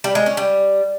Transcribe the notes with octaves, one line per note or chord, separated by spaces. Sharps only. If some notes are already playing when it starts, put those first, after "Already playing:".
G3
G#3
C#4
G3